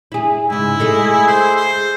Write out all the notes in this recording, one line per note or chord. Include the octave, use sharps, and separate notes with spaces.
E4 G#4
G#2 C#3 E4
G#3 A3 G#4
C5
C5